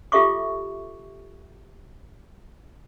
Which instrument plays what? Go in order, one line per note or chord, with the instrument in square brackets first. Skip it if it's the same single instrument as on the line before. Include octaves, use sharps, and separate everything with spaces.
[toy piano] F4 G4 A4 E5 C#6 D6